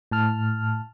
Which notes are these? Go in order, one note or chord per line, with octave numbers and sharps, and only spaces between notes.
A2 A5 F6